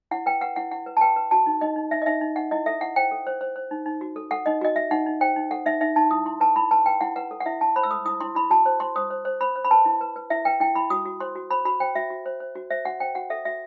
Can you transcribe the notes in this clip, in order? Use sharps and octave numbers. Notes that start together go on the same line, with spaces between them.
E4 F#5
B4 G5
B4 F#5
E4 F#5
E4 F#5
B4
A5
B4 G5
B4
F#4 A5
D#4
D#4 D#5
D#4
D#4 E5
D#5
D#4 E5
D#4
D#4 F#5
E4 D#5
A4 E5
E4 F#5
C5 G5
A4
C5
C5
C5
D#4
D#4
F#4
A4
A4 F#5
D#4 D#5
F#4 D#5
F#4 E5
D#4 F#5
D#4
C5 G5
D#4
A4 F#5
D#4 E5
D#4 E5
D#4 A5
E4 D#6
E4 C6
B4 A5
E4 B5
B4 A5
B4 G5
E4 F#5
B4 F#5
A4
F#5
E4 E5
E4 A5
C5 B5
E6
A4 D#6
E4 D#6
E4 C6
E4 B5
F#4 A5
C5
C5 C6
C5 D#6
C5
C5
C5 B5
C5
B5
B4 A5
E4
B4
B4
E4 E5
B4 G5
E4 G5
E4 B5
F#4 D#6
F#4
C5 C6
F#4
C5 B5
F#4 B5
C5 G5
F#4 E5
F#4
C5
C5
F#4
C5 E5
F#4 F#5
C5 G5
F#4 F#5
A4 E5
F#4 E5